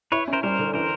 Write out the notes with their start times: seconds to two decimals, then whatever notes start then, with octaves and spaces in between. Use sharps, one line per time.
0.12 E4 B4 C#5
0.28 C#4
0.33 A#4 C5
0.43 G3 A#4 C5
0.59 D3
0.74 E3 A#4 C5